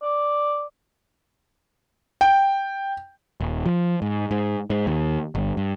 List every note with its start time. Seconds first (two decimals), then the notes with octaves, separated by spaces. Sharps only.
0.02 D5
2.21 G5
3.40 D#1
3.66 F3
4.02 G#2
4.31 G#2
4.70 G#2
4.87 D#2
5.35 G1
5.57 G2